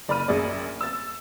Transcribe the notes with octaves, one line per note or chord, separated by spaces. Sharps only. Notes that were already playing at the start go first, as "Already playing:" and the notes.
F#1 D5 A#5 B5 F6 D#7
A#1 F#2 G#4 D5
E6 A6